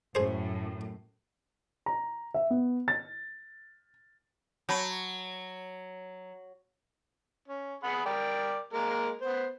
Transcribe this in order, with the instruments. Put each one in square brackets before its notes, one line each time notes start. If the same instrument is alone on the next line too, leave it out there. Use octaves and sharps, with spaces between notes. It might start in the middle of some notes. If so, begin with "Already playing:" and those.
[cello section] F#2 A2 [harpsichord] G#4 C5
[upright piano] A#5
E5
B3
A6
[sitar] F#3 [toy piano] C#5 A5 B5
[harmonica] C#4
G#4 F#5 B5
A#4 D5 G5
G#3 A#3 A#4
B3 C5